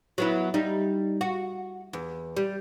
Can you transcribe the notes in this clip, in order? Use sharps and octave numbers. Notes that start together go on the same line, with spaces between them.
F#3 B3 E4
G3 D#4
F#4
E2
G3